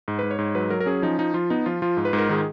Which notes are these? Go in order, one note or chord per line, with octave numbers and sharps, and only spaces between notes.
G#2
G#2 B4
C#5
G#2
F#3 B4
F#3 A#4
A#4
C#4 G#4
F3 D#4
F3 D#4
F3 F4
B3 D#4
F3 F4
F3 F4
G#2
B4
G#2
A#4
D#3 G#4